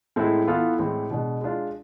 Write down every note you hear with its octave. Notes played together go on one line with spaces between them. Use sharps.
A2 G#3 C4 E4 A4
E3 B3 F4 A4
A2 E3 G#3 C4
B2 G#3 D4
G#3 D4 F4